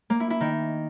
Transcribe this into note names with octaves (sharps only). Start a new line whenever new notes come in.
A#3
E4
E4
D#3